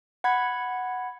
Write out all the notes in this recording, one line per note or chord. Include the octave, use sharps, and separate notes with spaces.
F#5 B5 G#6